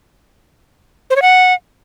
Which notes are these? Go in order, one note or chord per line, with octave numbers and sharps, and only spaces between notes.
C5
C#5
F#5